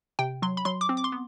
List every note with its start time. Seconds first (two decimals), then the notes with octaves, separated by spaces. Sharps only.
0.19 C3 G5
0.42 F#3 C6
0.57 B5
0.65 F#3 C6
0.81 D6
0.89 C4
0.97 D6
1.04 C6
1.12 B3